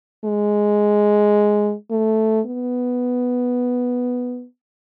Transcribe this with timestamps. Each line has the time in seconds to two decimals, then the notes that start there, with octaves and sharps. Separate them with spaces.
0.24 G#3
1.91 A3
2.46 B3